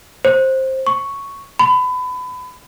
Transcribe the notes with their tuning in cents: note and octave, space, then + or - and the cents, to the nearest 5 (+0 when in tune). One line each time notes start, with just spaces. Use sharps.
C5 +15
C#6 +0
B5 +25